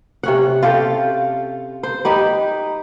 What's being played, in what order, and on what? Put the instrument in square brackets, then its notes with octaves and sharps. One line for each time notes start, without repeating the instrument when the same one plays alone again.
[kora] C3 C#4 F#5
F4 G4 A4
C5
D#4 G4 B4